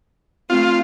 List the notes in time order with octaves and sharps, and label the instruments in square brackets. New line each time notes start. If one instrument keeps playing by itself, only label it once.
[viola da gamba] A3 C4 [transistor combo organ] F4